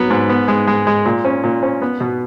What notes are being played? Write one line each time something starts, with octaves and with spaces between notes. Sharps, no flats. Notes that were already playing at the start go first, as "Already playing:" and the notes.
Already playing: F#3 B3
G#2
B3
G#3
G#3
G#3
A#2
C#4
A#2
C#4
B3
B2